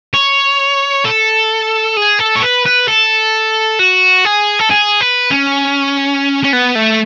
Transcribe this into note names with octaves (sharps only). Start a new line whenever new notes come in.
C#5
A4
G#4
A4
C#5
B4
B4
A4
F#4
G#4
A4
G#4
B4
C#4
C#4
B3
A3